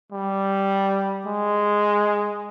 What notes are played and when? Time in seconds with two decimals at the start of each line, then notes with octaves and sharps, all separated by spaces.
0.12 G3
1.26 G#3